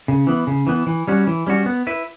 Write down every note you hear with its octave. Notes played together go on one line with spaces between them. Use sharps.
C#3
E3 B3
C#3
E3 B3
E3
G3 C#4 F#4
E3
G3 C#4 F#4
B3
E4 B4